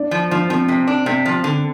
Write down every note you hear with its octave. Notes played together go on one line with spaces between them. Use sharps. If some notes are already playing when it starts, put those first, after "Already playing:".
Already playing: D4 D5
F3
F3 D4
F3 C4
C3 C4
D4
C3 C4
F3
D3